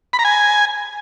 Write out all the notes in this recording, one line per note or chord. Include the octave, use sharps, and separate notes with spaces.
B5
A#5
G#5